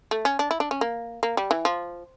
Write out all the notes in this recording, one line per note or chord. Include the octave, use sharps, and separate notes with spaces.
A3
C#4
D4
E4
D4
C#4
A#3
A#3
G3
E3
F3